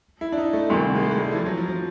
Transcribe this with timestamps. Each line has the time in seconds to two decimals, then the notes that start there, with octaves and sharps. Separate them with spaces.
0.21 E4
0.32 D4
0.37 D#4
0.53 A3
0.69 D2 C3 D#3 G3
0.95 G#3
1.03 A3
1.11 G#3
1.20 G3
1.31 E3
1.36 F3
1.46 F#3
1.57 F3
1.68 F3